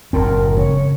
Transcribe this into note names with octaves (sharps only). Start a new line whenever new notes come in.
F#1 A2 C4 A#4
C#3 C#5